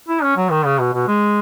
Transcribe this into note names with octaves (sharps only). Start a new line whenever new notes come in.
E4
C#4
F#3
D#3
C#3
B2
B2
G#3